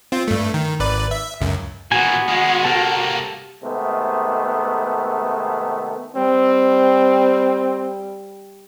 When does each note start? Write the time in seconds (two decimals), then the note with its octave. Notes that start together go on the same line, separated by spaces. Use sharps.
0.12 C4 F4
0.28 G2 A3
0.54 D#3
0.80 G#1 B4 D5
1.11 E5
1.41 C#2 F#2
1.92 A#2 E3 B3 F#4 G#5
2.29 D#3 G#3 F#4
2.65 C2 A#3 G4 A4 A5
3.63 C3 D#3 G#3 A3 B3
6.16 G3 C4